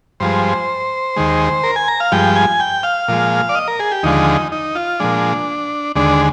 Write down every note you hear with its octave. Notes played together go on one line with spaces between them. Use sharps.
G2 F3 G#3 C5
D#2 D#3 G#3
A#4
G#5
A#5
F5
G2 F3 G#3 G5
G#5
G5
F5
A#2 F3 G#3
D5
D#5
A#4
G#4
G4
D#2 D3 F3 G#3 D#4
D#4
F4
A#2 F3 G#3 D4
D#2 D3 G#3 D4